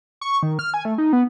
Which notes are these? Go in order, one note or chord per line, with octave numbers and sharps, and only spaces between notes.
C#6
D#3
F6
G#5
A3
D#4
B3